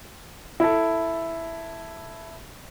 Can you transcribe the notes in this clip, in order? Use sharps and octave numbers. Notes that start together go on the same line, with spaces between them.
E4 A4